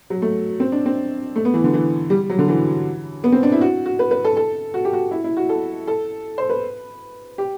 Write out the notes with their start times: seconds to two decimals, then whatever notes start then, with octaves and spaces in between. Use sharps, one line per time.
0.10 F#3
0.22 A3
0.60 C4
0.72 D4
0.86 C4
1.36 A3
1.45 B3
1.54 E3
1.64 D3
1.74 E3
2.10 G3
2.30 F#3
2.39 D3
2.48 E3
3.24 B3
3.32 C4
3.43 D4
3.52 E4
3.61 F#4
3.86 F#4
3.99 B4
4.11 B4
4.25 A4
4.37 A4
4.74 F#4
4.85 G4
4.93 F#4
5.11 E4
5.24 E4
5.37 F#4
5.49 A4
5.87 A4
6.38 C5
6.49 B4
7.38 G4